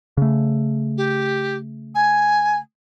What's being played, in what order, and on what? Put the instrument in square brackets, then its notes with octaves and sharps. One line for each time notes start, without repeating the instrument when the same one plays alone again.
[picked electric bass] C#3 A3
[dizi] G4
G#5